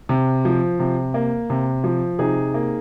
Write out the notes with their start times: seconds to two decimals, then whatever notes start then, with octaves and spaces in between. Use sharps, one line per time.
0.09 C3
0.45 F3
0.79 C3
1.14 A#3
1.50 C3
1.84 F3
2.19 C3 D#4 G#4
2.54 A#3